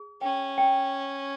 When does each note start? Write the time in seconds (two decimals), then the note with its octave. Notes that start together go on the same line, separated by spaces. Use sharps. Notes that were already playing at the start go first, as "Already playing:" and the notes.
Already playing: G#4
0.21 C#4 G5
0.58 G5